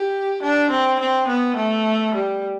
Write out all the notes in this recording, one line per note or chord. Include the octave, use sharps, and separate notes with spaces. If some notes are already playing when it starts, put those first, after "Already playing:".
Already playing: G4
D4
C4
C4
B3
A3
G3